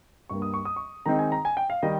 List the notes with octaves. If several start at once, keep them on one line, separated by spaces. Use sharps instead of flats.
G2 G3 A#3 C#6
D#6
C#6
D#6
C#6
D#3 G#3 C4 D#4 A#5
G#5
A#5
G#5
G5
F5
D#3 G3 D#5